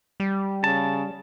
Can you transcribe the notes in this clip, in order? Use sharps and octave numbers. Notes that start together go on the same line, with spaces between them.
G3
C#3 A5